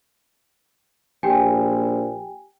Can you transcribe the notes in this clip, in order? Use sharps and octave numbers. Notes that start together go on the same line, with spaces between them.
A#1 G4 G5 G#5